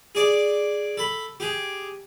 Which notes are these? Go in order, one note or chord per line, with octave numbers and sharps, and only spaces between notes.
G#4 D5
A4 B5
G4 G#4